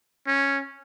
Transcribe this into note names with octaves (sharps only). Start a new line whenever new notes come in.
C#4